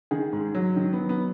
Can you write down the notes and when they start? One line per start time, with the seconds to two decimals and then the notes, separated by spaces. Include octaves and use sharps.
0.11 D#3 G#4
0.33 G#2
0.55 F#3
0.76 D#3
0.93 B3
0.98 F#3
1.09 B3